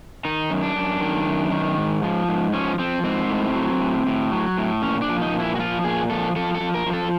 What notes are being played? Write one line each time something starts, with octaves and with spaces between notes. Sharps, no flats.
D#3 D#4
F#2
D4
F#2
D#3
F#2
D#3
G#2
F3
G#2
F3 C#4
F3 C4
G#2 C4
A2
F#3
A2
A2
F#3
A2
A#2 C#4
D4
F3
D#4
A#2
E4
F#4
F3 F4
A#2 G#4
F3 A4
F3 A4
A4
F3
A#4
F3
A4